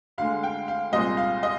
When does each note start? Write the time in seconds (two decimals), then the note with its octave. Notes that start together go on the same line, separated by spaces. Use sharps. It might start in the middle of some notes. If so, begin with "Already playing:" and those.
0.18 D2 D3 G#3 F5
0.43 G5
0.68 F5
0.92 C2 A#2 G#3 C4 D#5
1.17 F5
1.43 D#5